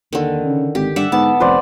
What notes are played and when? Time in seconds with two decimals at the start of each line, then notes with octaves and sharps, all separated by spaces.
0.13 D#2 D3 D#3
0.45 C#3
0.75 G#1 G4
0.96 G2 D5 E5 F#5
1.12 G#2 B3 A5
1.40 F1 B4 C5 D5